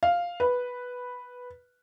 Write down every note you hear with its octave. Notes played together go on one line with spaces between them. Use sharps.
F5
B4